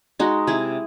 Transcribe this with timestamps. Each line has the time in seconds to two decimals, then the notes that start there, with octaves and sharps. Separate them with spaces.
0.19 G#3 D#4 F#4
0.47 C3 E4 G#4